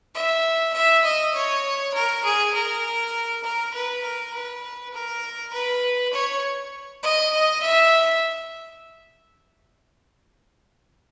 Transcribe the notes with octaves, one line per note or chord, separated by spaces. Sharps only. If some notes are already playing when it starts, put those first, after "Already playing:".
E5
E5
D#5
C#5
A#4
G#4
A#4
A#4
B4
A#4
B4
A#4
B4
C#5
D#5
D#5
E5